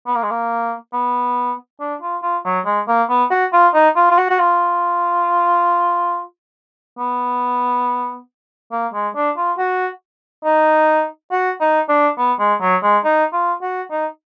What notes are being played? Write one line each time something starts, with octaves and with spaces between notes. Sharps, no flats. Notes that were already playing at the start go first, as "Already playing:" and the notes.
B3
A#3
G#3
A#3
B3
D4
F4
F4
F#3
G#3
A#3
B3
F#4
F4
D#4
F4
F4
F#4
F#4
F4
B3
A#3
G#3
D4
F4
F#4
D#4
F#4
D#4
D4
B3
G#3
F#3
G#3
D#4
F4
F#4
D#4